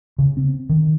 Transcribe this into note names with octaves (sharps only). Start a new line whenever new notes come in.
C#3
C4
D#3